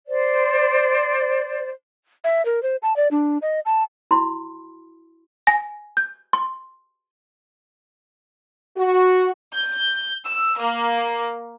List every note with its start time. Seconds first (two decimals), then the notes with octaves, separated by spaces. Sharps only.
0.06 C5 D5
2.24 E5
2.45 A#4
2.63 C5
2.82 A5
2.96 D5
3.11 D4
3.42 D#5
3.66 A5
4.11 E4 F#4 B5 C6
5.47 G#5 A#6
5.97 G6
6.33 C6
8.77 F#4
9.53 G6
10.25 E6
10.59 A#3